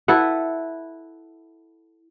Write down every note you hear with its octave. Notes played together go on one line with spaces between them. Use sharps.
E4 A4 B4 F#5